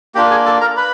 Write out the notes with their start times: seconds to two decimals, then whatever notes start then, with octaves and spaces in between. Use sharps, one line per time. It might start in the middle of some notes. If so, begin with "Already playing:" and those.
0.15 A#3 D4 F4 G4 G5
0.31 G#4 G#5
0.45 A4 A5
0.61 A#4 A#5
0.77 B4 B5